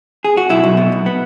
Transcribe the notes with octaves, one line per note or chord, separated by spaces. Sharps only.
G#4
F#4
B1 E4
B1
B2
B1
B3